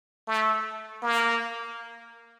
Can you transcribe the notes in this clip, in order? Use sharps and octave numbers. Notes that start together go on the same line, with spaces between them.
A3
A#3